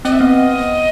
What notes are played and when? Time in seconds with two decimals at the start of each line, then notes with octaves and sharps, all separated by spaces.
0.05 C4 D#5
0.12 E5
0.19 B3 D#5